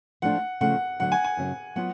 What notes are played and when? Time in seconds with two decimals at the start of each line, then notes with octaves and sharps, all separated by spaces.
0.22 F3 A3 D4 F4 F#5
0.61 D2 C#3 F3 A3 F#5
1.00 D2 D3 F#3 F#5
1.12 G#5
1.24 G#5
1.37 F#2 C#3 F#3
1.76 F#3 B3 F4 F#5